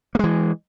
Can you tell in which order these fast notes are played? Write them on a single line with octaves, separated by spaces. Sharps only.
A#3 G#3 E3